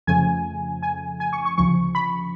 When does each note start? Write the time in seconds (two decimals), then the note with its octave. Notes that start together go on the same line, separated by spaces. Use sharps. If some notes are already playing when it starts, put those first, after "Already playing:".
0.07 F2 C#3 F3 A3 G#5
0.83 G#5
1.20 G#5
1.33 C#6
1.45 C#6
1.57 D2 C#3 F3 C#6
1.95 B5